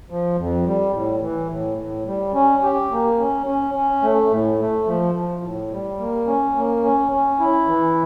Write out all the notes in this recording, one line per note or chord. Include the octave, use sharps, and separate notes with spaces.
F3
F2
G3
A2
E3
A2
A2
G3
C#4
G4
A#3
C#4
C#4
C#4
A3
A2
A3
F3
F3
A2
G3
A#3
C#4
A#3
C#4
C#4
E4
E3